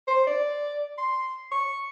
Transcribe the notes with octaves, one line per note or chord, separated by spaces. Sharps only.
C5
D5
C6
C#6